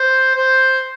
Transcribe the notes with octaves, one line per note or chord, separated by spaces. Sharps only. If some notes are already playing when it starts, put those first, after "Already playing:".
Already playing: C5
C5